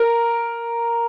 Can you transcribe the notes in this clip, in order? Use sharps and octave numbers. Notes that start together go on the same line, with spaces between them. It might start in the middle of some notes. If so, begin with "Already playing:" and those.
Already playing: A#4